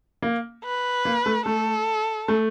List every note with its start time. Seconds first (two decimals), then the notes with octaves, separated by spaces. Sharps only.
0.22 A#3
0.64 B4
1.05 A#3
1.26 A3
1.46 A3 A4
2.28 A3